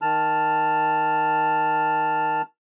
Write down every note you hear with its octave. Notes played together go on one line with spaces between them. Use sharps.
D#3 A5 F6